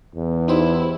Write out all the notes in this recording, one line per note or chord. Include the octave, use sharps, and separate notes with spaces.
E2
D#4 E4 G4 C5